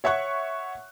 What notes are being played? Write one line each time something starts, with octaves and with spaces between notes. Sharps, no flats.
C#5 E5 F#5 C#6 F#6